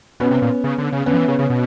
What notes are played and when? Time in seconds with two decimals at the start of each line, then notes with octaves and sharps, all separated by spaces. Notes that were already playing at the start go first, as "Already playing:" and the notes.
0.20 B2 B3 C#4
0.31 C3
0.42 A#2
0.64 C#3
0.78 D3
0.93 C#3
1.06 D3 B3 C#4
1.14 F3
1.17 E3
1.28 C#3
1.39 C#3
1.50 B2